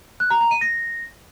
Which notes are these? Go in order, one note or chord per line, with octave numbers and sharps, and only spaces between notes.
F#6
A#5
A#5
D#7
A#6